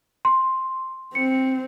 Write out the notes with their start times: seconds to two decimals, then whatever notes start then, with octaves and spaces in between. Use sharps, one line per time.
0.25 C6
1.15 C4 C#7